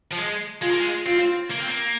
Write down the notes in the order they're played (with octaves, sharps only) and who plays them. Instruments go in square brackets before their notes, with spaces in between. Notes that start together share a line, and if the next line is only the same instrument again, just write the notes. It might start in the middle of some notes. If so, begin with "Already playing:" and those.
[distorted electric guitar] F3
G#3
[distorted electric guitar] G#3 [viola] F4
[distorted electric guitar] A#3
G#3
[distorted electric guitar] C4 [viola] F4
[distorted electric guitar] A#3
C4
A#3